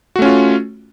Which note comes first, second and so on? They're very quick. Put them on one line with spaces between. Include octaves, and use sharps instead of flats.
F#4 A3 C#4 F4